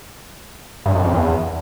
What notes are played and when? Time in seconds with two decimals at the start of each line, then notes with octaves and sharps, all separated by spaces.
0.86 G2
0.95 F#2
1.04 F2
1.14 E2